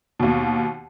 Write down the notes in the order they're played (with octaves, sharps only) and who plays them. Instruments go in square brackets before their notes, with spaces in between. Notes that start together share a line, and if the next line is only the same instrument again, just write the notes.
[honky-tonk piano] D#2 B2